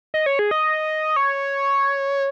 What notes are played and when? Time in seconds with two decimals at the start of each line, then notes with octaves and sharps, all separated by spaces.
0.14 D#5
0.26 C#5
0.39 G#4
0.51 D#5
1.16 C#5